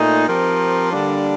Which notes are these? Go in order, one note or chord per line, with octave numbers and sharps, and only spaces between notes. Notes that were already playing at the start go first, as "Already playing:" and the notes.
Already playing: A#2 A3 D#4
F3 C4 G4 A#4
D3 G3 A#3 D4